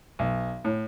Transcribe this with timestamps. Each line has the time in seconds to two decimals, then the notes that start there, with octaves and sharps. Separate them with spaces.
0.19 B1
0.64 A2